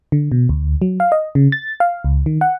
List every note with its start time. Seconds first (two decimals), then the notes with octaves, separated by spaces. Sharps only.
0.12 D3
0.32 B2
0.49 D2
0.82 F#3
1.00 F5
1.12 D#5
1.35 C#3
1.52 A6
1.80 F5
2.04 C#2
2.26 D#3
2.41 F#5